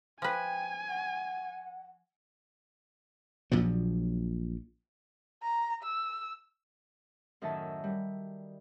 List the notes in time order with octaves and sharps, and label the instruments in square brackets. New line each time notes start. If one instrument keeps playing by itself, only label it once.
[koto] F3 B4 [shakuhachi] G5 [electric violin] G#5
[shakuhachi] F#5
[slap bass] A#1 A#2 F3 F#3
[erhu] A#5
E6
[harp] F#2 A2 D#3 E5 A5 E6
G3